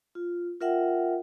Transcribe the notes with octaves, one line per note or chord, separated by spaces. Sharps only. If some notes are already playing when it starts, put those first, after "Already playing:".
F4
F4 A#4 E5 F#5 G5